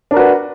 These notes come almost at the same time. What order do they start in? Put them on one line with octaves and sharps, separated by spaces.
D4 A#4 F#4 B4